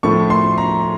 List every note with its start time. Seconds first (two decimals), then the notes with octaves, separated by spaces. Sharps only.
0.03 A2 F3 A3 C#6
0.30 C6
0.58 A#5